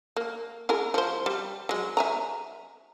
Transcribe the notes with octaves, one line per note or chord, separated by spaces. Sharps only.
A#3
E4 G#4 A#4
F3 C5
G3
F#3 G#3
E5 G#5 A#5